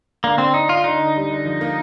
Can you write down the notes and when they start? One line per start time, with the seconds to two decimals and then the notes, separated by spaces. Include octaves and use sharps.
0.24 D3 A#3
0.38 C4 D4
0.54 D4 D#4
0.69 D4 F4
0.84 D3 D#4
1.00 D3
1.16 G3
1.30 D3
1.46 F3
1.61 A#3